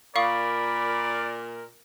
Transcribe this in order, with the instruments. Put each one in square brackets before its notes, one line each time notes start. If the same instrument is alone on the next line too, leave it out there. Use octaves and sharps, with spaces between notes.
[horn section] A#2 A#4 [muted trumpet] D5 [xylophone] F5 C#6 D#6 [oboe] B5